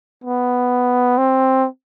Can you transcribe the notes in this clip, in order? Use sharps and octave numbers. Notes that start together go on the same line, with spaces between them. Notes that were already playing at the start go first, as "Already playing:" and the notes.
B3
C4